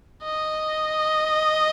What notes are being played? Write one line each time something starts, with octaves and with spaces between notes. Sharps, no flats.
D#5